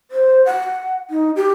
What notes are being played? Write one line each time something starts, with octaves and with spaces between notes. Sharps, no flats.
C5
F#5
D#4
G4